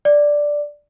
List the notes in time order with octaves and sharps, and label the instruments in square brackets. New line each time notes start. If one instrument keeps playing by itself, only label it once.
[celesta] D5